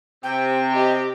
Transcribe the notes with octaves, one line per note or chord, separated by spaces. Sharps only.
C3 G5
G4 D#5